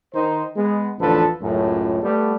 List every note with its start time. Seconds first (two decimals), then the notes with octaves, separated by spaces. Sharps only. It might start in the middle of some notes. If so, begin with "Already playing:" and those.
0.13 D#3 D#4 C5
0.56 G#3 B3
0.99 A1 E2 D3 F3 A4 B4
1.41 C#2 F#2 A2
2.03 G3 A3 B3